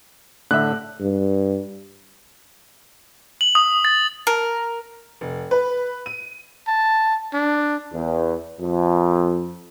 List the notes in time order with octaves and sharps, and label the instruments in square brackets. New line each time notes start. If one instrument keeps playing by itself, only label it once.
[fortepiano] A2 E5 [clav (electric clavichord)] D3 [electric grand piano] F#6
[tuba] G2
[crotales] F#7
D#6
A6
[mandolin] A#4
[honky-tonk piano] F1
B4
D#7
[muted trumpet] A5
D4
[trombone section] E2
F2